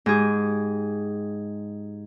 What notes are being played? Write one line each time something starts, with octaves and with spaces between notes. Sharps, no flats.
G#2 G4 G#4